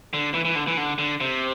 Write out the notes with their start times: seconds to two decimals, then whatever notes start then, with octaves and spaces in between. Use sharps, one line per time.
0.13 D3
0.34 E3
0.45 E3
0.55 D3
0.67 E3
0.77 D3
0.99 D3
1.20 C3